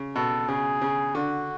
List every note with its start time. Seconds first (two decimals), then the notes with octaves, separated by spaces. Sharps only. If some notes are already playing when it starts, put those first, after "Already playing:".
Already playing: C#3
0.16 B2 A4
0.48 C#3 G#4
0.82 C#3
1.15 D3 F#4